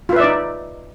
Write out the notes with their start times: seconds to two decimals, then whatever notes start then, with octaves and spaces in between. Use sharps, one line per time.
0.09 F4
0.13 B4
0.16 E5
0.20 D5
0.24 D#4